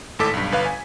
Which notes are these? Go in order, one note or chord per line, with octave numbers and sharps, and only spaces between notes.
G#1 A2 A4 D6 B6
B1 G2
G1 B4 F5
G#5